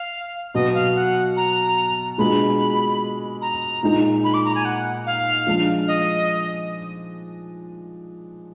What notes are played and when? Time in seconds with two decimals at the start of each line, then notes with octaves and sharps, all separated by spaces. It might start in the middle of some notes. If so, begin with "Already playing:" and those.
Already playing: F5
0.55 B2 F#3 B3 D#5
0.74 F5
0.96 F#5
1.37 A#5
2.18 B2 G#3 D4 F4 G#4 B5
3.42 A#5
3.83 A#2 G#3 D#4
4.24 B5
4.34 D6
4.45 A#5
4.55 G#5
4.65 F#5
5.06 F5
5.47 F3 G#3 D4
5.88 D#5